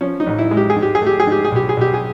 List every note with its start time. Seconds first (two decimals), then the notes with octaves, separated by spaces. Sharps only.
0.01 F3 C#4
0.20 D#4
0.27 A1
0.39 E4
0.51 G#3
0.57 G4
0.70 G#4
0.76 G#2
0.82 G4
0.95 G#4
1.02 A3 G4
1.20 G#4
1.27 G#2 G4
1.44 G#4
1.52 B1 G4
1.69 G#4
1.77 B1 G4
1.94 G#4